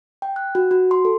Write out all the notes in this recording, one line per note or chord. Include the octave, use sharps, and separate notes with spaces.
G5
F#6
F#4
F#4
C6
A4